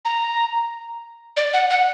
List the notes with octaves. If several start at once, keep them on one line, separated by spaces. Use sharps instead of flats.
A#5
D5
F#5
F#5